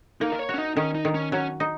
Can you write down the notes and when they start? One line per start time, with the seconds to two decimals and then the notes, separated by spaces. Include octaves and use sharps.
0.21 A#3 D#4
0.32 A#4
0.39 C#5
0.49 F#4
0.54 C#4
0.58 D#4
0.77 D#3 C#4
0.95 D#4
1.05 D#3
1.14 C#4
1.32 F#3 C#4
1.60 D#4